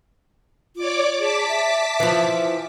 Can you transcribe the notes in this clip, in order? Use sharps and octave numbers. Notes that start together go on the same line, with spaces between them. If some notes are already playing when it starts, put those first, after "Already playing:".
F4 C#5 D5 D6
G#4 A5 D6 B6
E5
E3 F3